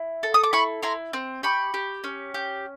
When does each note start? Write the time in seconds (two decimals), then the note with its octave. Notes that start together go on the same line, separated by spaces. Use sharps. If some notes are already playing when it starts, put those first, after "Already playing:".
Already playing: E4
0.23 A4
0.34 D#6
0.43 D6
0.53 E4 B5 C#6
0.83 E4 A#5 C6
1.13 C4
1.43 G4 B5 C#6
1.74 G4
2.04 C#4
2.34 G4